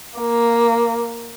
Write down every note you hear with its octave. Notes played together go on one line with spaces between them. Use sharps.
A#3